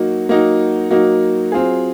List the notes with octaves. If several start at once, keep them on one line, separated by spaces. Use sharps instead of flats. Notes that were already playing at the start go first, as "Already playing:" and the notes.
Already playing: F#3 A#3 D#4 F#4
F#3 A#3 D#4 F#4
F#3 A#3 D#4 F#4
F#3 C4 F4 G#4